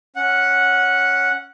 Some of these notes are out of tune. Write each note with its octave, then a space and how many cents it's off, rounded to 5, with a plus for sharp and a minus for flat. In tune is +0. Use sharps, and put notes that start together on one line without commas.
C#4 +0 F#5 -5